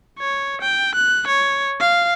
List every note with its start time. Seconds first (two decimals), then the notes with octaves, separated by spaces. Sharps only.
0.19 C#5
0.61 G5
0.95 F#6
1.28 C#5
1.80 F5